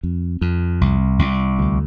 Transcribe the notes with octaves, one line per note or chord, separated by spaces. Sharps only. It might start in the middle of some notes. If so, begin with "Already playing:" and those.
F2
F2
C2
C2
D2